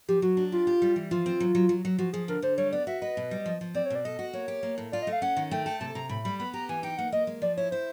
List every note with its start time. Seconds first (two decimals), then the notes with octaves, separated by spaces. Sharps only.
0.08 F3 G4
0.22 F#3 F#4
0.37 D4
0.52 F4 G4
0.67 G4
0.82 G3
0.96 E3
1.11 F3 F4
1.26 C4
1.40 F#3
1.55 F#3
1.69 F#3
1.85 F#3
1.98 F3 F#4
2.13 F3 G#4
2.28 D3 A#4
2.42 D3 C5
2.58 G3 C#5
2.72 B3 D5
2.87 F#4 E5
3.02 B4 D#5
3.17 B2
3.31 G3
3.46 F3
3.61 F3
3.75 C4 D5
3.86 C#5
3.90 B2 D5
4.05 A4 D#5
4.19 F#4
4.33 A#3 C#5
4.48 G4
4.63 A#3
4.78 A2
4.92 F4 D5
5.02 D#5
5.07 A3
5.12 F5
5.22 C#4 F#5
5.37 D#3
5.51 A3 G5
5.66 A4 G5
5.80 C3 A5
5.95 C3 A#5
6.09 A2 B5
6.24 G3 B5
6.39 B3 B5
6.54 G4 A#5
6.69 E3 G#5
6.83 D#4 G5
6.98 A#3 F#5
7.12 A#3 D#5
7.27 G#3
7.42 F3 D5
7.57 E4 C#5
7.71 E4 C5